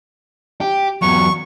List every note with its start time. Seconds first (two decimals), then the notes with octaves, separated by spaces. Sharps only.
0.61 G4
1.02 E2 F#3 C#6